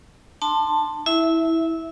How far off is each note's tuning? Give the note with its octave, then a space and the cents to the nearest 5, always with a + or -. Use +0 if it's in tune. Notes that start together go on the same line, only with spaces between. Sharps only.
D4 +40 A5 +10 C6 +0
E4 -15 E5 -5